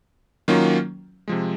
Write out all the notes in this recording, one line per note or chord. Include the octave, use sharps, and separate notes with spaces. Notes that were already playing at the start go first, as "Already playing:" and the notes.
D#3 F#3 A#3 C#4 F4
C3 F3 G#3